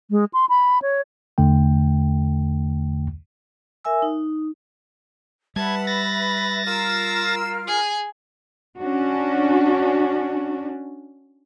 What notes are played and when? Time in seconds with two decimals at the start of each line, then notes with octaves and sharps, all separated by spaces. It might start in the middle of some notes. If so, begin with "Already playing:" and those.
0.11 G#3
0.34 C6
0.49 B5
0.82 C#5
1.38 E2 D3 A3 G5
3.85 A#4 E5 G#5 E6
4.02 D#4
5.56 G3 B4 E5 F#5 A5 G#6
5.87 B5 A6 A#6
6.66 F4 A#4 E6 F6 E7
7.67 G#4 G#5
8.78 C#4 D4 F#4